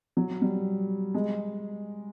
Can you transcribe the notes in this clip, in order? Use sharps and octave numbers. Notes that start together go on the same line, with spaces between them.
F#3
G3
G#3